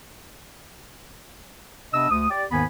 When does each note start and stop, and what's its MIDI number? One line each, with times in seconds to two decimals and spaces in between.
1.94 2.07 48
1.94 2.07 59
1.94 2.07 62
1.94 2.07 75
1.94 2.07 88
2.10 2.28 38
2.10 2.28 87
2.30 2.45 67
2.30 2.45 74
2.51 2.64 39
2.51 2.64 44
2.51 2.64 51
2.51 2.64 59
2.51 2.64 80
2.51 2.64 83